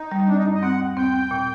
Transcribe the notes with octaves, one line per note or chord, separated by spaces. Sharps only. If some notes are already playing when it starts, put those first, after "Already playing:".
Already playing: D#4
G3
C4 D4
D#4
G2
D#5
C4 F#5
D#2
C4 G5
C4
A#2